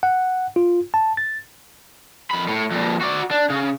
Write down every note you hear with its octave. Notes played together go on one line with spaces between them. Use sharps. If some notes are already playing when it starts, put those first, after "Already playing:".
F#5
F4
A5
A6
F2 B5
A2
F2 A#2
F#4 D5
D4
C#3